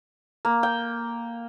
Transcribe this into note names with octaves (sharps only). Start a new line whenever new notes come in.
A#3
G5